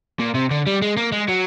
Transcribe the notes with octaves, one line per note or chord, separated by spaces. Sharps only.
A#2
C3
D3
G3
G#3
A#3
G#3
F#3